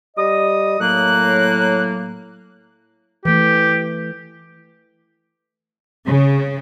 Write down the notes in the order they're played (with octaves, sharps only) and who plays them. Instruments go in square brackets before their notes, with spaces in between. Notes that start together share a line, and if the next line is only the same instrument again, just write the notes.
[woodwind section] G3 D#5 D#6
[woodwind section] A2 F#3 A#3 [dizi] F#6
[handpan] E3 A3 [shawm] G4
[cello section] C#3